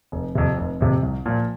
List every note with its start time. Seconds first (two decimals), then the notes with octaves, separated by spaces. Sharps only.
0.12 F1
0.35 F2 C3
0.58 F1
0.80 F2 C3
1.03 C2
1.26 A#2 F3